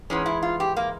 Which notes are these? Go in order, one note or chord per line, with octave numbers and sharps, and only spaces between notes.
G#2 E3 G#3 C#4
E4
F4
G4
A#3